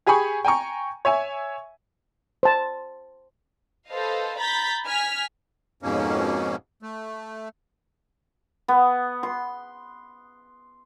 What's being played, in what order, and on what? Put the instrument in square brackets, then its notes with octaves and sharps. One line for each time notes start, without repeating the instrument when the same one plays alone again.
[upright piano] G4 G#4 G#5 B5 C#6
G5 G#5 A#5 C#6
C#5 E5 G#5
[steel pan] C5 A5
[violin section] A4 B4 C5 D#5 F5
A#5 B5 G6 A6 B6
G#5 F6 B6
[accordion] F2 G#2 B2 A#3 C#4
A3
[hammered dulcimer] B3
C6